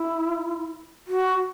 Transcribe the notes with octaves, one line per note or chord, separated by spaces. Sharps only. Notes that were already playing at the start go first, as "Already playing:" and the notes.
Already playing: E4
F#4